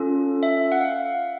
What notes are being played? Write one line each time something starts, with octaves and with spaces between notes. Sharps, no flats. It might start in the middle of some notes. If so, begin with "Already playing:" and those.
Already playing: C#4 F4 A4
E5
F#5
F5